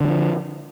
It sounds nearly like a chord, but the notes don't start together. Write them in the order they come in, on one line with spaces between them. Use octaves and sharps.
D3 G3 F3